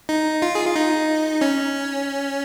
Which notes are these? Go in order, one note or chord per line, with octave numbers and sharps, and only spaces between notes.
D#4
F4
G#4
F4
D#4
C#4